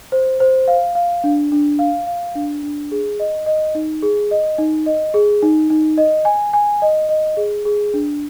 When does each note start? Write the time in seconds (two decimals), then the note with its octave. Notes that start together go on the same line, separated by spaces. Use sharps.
0.12 C5
0.40 C5
0.68 F5
0.95 F5
1.24 D4
1.52 D4
1.79 F5
2.07 F5
2.35 D4
2.63 D4
2.91 G#4
3.20 D#5
3.46 D#5
3.75 D#4
4.03 G#4
4.31 D#5
4.58 D#4
4.86 D#5
5.14 G#4
5.43 D#4
5.70 D#4
5.98 D#5
6.25 G#5
6.53 G#5
6.82 D#5
7.09 D#5
7.37 G#4
7.65 G#4
7.94 D4